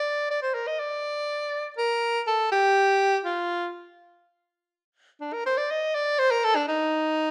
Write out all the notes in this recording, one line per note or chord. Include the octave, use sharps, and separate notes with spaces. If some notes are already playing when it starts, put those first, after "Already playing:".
Already playing: D5
D5
C5
A#4
D#5
D5
A#4
A4
G4
F4
D4
A#4
C5
D5
D#5
D5
C5
A#4
A4
D4
D#4